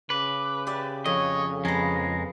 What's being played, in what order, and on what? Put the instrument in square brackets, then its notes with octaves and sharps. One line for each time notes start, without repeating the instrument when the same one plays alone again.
[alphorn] C#3 [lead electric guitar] B4 [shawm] D6
[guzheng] G4 D5 E5
[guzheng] F2 [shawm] C#5 [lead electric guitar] D#5
[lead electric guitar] F2 G#3 [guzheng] B3 G#4 [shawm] A#5